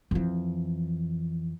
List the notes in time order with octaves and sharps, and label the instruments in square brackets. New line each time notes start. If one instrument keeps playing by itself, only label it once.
[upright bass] F2 E3